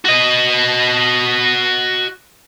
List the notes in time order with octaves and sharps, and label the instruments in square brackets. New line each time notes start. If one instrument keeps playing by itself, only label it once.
[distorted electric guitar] F#4 D#5